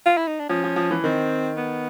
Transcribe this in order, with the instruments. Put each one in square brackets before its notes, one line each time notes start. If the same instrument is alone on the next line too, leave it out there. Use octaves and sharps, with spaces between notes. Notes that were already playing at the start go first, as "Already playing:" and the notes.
[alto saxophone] F4
E4
D#4
D4
[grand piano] F3 [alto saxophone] C#4
[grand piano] F3
F3
E3
[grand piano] D#3 [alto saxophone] C4
[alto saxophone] B3